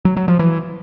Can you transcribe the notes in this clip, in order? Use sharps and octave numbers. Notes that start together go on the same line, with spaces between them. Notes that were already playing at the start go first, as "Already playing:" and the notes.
F#3
F#3
F3
E3